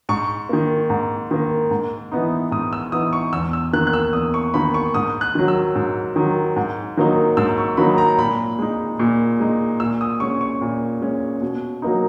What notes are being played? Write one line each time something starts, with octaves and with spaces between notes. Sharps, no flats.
G#2 C#6
D#3 A#3
G#2
D#3 A#3
G#2
E3 B3 D#4
G#2 D#6
E6
E3 B3 D#4 D#6
C#6
E2 E6
E6
D#3 A#3 F#6
F#6
E6
E2 D#6
C#6
D#3 A#3 B5
C#6
G#2 D#6
F#6
D#3 F#3
E6
G#2
D#3 F#3
G#2
D#3 F#3 A#3 D#4
G#2 E6
C#6
D#3 F#3 A#3 D#4 B5
A#5
A#2 B5
G#3 D#4
A#2
G#3 D#4
A#2 E6
D#6
G#3 C#4 C#6
C#6
A#2
G#3 C#4
B2
F#3 A#3 D#4